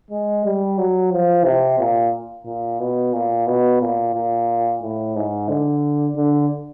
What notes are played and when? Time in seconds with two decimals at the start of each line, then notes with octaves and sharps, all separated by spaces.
0.11 G#3
0.45 G3
0.78 F#3
1.12 F3
1.45 C3
1.79 A#2
2.46 A#2
2.80 B2
3.13 A#2
3.47 B2
3.81 A#2
4.14 A#2
4.82 A2
5.16 G#2
5.48 D3
6.16 D3